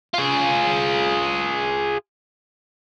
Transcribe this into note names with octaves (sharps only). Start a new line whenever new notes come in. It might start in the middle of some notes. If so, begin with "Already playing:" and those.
F4 G#4